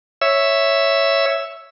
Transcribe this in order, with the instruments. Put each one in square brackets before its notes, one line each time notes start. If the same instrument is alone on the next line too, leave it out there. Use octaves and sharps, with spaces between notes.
[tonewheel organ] C#5 E5 E6